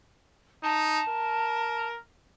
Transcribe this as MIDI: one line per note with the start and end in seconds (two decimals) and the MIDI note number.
0.64 1.01 63
0.64 1.87 81
1.09 1.99 70